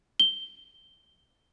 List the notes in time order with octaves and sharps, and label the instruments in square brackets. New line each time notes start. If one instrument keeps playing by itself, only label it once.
[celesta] G7